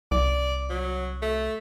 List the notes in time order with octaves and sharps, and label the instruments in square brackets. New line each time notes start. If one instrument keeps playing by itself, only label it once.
[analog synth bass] C2 [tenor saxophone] D5
[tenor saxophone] F#3
A3